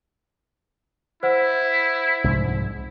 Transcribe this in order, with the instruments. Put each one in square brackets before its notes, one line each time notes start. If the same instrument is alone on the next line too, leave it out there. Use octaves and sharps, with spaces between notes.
[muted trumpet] E4 [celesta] C5 F#5
[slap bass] C2 G#2 F3